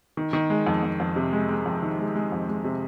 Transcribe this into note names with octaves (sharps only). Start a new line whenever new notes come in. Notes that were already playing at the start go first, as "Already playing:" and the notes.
D#3
D#3
G#3
F2
F2
F2
C3
G#3
G#3
F2
D#3
G#3
G#3
F2
G#3
C3